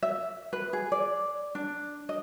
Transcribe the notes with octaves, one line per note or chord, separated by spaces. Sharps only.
E5
B4
G#4
D5
D4
D#5